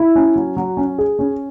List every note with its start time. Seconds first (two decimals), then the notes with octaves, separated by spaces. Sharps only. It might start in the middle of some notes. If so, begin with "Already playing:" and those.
Already playing: E4
0.15 C#4
0.36 F#3
0.57 F#3
0.77 C#4
0.98 G#4
1.19 C#4